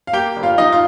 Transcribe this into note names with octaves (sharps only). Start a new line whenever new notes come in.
F5
A#3 G4 G5
G1
F4 F5
F3 D#4 D#5
F4